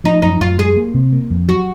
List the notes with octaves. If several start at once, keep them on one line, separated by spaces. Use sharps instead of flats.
F3 D#4
F#2 D#4
F#2 F4
G#3 G#4
A#3
C3
A#3
F2
F#3 F#4